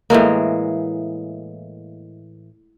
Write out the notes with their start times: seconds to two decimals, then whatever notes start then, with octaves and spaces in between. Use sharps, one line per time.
0.10 A2 E3 G#3 A#3